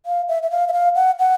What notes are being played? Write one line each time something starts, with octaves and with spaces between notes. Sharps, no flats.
F5
E5
E5
F5
E5
F5
F#5
F#5